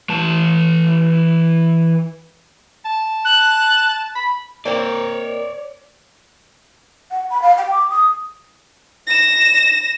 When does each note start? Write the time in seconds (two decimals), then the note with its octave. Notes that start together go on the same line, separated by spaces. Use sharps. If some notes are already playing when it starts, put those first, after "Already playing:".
0.09 E3 A5
2.85 A5
3.25 F#6
4.15 B5
4.65 A#3 C4 A#4 C#5 D5
7.11 F#5
7.30 B5
7.42 F5
7.58 G5
7.71 D6
7.90 D#6
9.07 A#6 E7